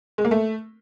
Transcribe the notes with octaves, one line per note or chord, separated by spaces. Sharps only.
G#3
A#3
A3